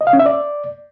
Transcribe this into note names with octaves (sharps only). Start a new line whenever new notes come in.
D#5
F5
C#4
E5
D5